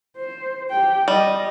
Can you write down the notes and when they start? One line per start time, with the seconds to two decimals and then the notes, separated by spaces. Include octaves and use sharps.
0.17 C5
0.71 G4 G5
1.08 G3 D#5